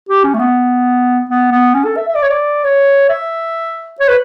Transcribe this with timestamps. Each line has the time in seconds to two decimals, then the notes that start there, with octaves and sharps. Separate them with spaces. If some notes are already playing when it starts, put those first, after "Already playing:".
0.09 G4
0.24 C#4
0.34 A3
0.39 B3
1.30 B3
1.52 B3
1.75 C#4
1.85 A4
1.97 E5
2.08 E5
2.15 D5
2.23 C#5
2.30 D5
2.64 C#5
3.09 E5
4.00 C#5
4.08 B4